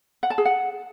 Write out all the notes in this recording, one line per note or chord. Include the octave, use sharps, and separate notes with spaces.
F#5
A5
G#4
F#5